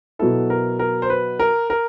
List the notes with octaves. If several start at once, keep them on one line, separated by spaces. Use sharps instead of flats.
B2 F#3 B3 E4 A4
A#4
A#4
C5
B4
A#4
A#4